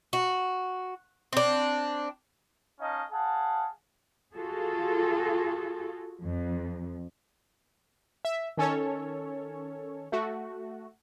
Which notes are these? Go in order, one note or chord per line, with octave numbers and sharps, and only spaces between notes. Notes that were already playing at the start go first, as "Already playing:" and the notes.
F#4
C4 D4
C#4 D#4 D#5 F5 A5
G#4 F5 F#5 A5
F4 F#4 G#4 A4
F2
E5
D#3 C#4 A4 C#5
A3 F#4